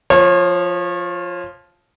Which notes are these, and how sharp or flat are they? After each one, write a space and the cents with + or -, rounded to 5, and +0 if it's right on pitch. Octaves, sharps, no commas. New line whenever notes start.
F3 +0 C#5 -35